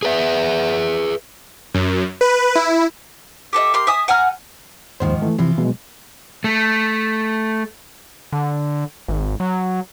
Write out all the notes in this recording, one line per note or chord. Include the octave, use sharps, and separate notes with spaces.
G#4 B4 E5
F#2
B4
E4
G4 A4 D#5 E5
G4 A#4 C6
E5 G#5 D#6
F#5 G#5 A#5 F6
D#2 G#2 D#3 F3 C5
E3 A3
C3 E3 F3 F4
B2 F#3 G#3
A3
D3
G#1
F#3